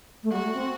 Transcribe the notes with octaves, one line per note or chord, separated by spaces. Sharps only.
A3
G3 F#4
A3
C4